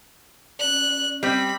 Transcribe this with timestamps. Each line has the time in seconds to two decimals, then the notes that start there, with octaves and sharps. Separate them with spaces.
0.59 C#4 D5 F#6
1.23 G3 C4 B5